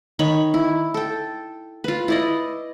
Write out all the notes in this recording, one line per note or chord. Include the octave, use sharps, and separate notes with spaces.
D#3 C#5 B5
E4
A4 G5
F4 B4
E4 D5 D#5